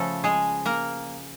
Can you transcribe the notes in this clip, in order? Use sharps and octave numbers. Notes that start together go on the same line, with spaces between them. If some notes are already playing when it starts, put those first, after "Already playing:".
Already playing: C#3 F3 A3 A4
G#3 G#4
A#3 A#4